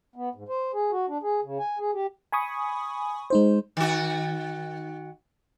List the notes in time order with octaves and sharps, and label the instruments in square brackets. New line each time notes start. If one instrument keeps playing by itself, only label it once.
[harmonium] B3
G#2
C5
G#4
F#4
D4
G#4
C#3
G#5
G#4
G4
[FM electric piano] G#5 B5 C#6 D#6
G#3 D#4 C5
[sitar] D#3 F#4